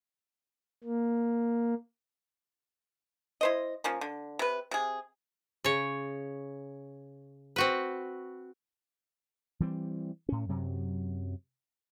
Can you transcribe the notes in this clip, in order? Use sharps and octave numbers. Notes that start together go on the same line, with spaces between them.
A#3
E4 C5 D#5
F3 A#3 C#4
D3
C3 B4
C3 G#4
C#3 C#5
C4 F#4 B4
E3 G3 C4
A2 C#4
F#2 C3 F#3